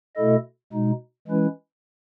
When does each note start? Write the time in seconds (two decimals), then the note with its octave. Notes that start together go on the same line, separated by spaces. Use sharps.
0.16 B2 A3 E4 A4 D#5
0.73 B2 G#3 D#4
1.28 E3 G#3 C#4 E4 B4